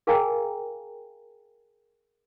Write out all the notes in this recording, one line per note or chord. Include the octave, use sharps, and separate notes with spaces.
G#4 A#4 F5 G5 G#5 A#5